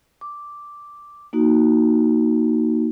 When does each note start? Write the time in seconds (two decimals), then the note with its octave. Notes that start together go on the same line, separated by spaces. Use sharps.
0.21 D6
1.33 A#3 D#4 F#4